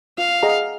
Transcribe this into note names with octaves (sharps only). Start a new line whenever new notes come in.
F4 F5
G#4 D#5 F#5 A#5